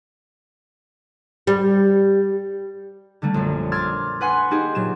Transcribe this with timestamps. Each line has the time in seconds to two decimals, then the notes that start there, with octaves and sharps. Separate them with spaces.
1.47 G3
3.22 D3 G3 A3 A#3
3.34 A#1 F#2
3.72 C6 D6 E6 F6 G#6 A6
4.21 B4 F#5 G#5 C6 F#6
4.51 A#3 D#4 G4 G#4
4.75 A#2 F#3 E7